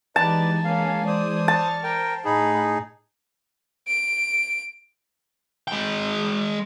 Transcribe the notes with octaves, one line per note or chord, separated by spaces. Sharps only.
E3 G#3 D#4 G4 B4 D5 G#5 A5
A#3 C#4 F5
C5 D5 D#6
A5 C#6 F6
A#4 C5 G5
A2 D#4 G#4 F#5 B5
D7
G#3 G5